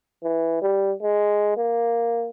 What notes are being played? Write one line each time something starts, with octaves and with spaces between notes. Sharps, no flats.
E3
G3
G#3
A#3